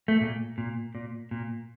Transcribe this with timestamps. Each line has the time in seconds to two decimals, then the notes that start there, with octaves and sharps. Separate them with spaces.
0.08 A3
0.21 A#2
0.58 A#2
0.95 A#2
1.31 A#2